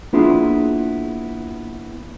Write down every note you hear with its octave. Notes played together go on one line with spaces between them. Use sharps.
A#3 B3 D4 E4 F4 G#4